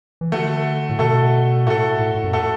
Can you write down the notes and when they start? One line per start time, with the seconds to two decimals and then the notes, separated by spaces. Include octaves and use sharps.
0.21 E3
0.32 D3 A3 F#4 A4
0.89 A2
0.99 B2 A3 F#4 A4
1.66 A2 A3 F#4 A4
1.99 A2
2.15 A2
2.24 F#2
2.33 A3 F#4 A4